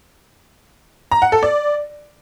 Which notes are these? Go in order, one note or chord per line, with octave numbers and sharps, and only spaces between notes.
A#5
F#5
A4
D5